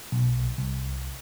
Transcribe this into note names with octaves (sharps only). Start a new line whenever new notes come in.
B1
C2